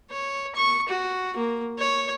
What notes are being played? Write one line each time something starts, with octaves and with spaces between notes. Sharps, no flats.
C#5
C#6
F#4
A#3
C#5